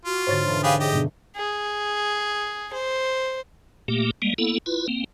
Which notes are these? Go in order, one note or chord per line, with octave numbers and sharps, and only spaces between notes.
F4 F#4
G#2 D3 C5 C#5 A6
E1
G4 G#4 B4 F5
G4 G#4 D#5
G2 B2 D4
G#4
C5
A#2 A3 A#3 G4
G3 G#3 A#3
A#3 B3 E4 A4
E4 F4 B4
A#3 C4